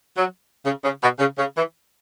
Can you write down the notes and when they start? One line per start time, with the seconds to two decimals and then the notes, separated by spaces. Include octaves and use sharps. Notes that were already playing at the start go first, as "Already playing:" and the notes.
0.16 F#3
0.64 C#3
0.83 C#3
1.01 B2
1.19 C#3
1.38 C#3
1.56 E3